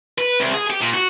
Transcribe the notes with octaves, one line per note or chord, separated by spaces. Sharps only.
B4
C2
G#4
G4
A#2
F#4